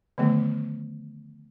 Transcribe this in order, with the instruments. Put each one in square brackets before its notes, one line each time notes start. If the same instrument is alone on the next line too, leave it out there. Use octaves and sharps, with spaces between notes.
[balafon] D3 D#3 F3 A3 B3